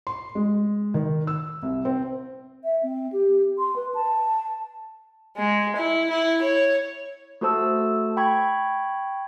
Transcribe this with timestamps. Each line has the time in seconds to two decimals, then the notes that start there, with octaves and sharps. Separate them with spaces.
0.07 C6
0.35 G#3
0.94 D#3
1.27 E6
1.62 C2
1.85 C4
2.64 E5
2.83 C4
3.12 G4
3.58 C6
3.76 B4
3.94 A5
5.37 G#3
5.77 E4
6.10 E4
6.43 C#5
7.41 A3 F#4 A4 C5 A5 E6
8.17 G5 B5 C#6 G#6